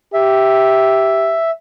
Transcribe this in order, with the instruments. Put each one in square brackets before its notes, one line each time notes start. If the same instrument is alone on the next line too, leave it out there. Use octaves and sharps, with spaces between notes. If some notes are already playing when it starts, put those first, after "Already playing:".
[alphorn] G4 [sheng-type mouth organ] E5